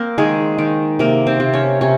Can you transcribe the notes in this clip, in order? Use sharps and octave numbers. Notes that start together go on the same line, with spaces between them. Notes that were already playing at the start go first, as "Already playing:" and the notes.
Already playing: A#3 C4 A#4 C5
D#3 G#3 G#4
D#3
C3 A#3 A#4
C4 C5
C3
C#4 C#5
C3 C#4 C#5